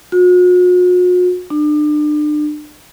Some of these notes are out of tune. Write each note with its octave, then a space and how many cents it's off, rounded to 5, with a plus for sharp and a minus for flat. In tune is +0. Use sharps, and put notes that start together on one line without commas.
F#4 -45
D4 +35